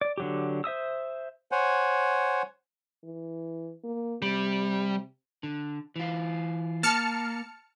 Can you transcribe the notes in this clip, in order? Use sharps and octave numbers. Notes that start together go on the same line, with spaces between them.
D5
D3 F#3 G4
C5 E5 D#6 E6
C5 C#5 F#5 G#5
E3
A#3
C3 G3
D3
E3 F4
A#3 A5 F6 C#7